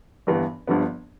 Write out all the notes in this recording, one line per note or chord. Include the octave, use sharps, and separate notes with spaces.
G1 G2 E3 B3
G1 G2 D3 F3 B3